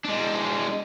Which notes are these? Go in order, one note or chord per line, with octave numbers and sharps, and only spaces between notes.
G#3 D4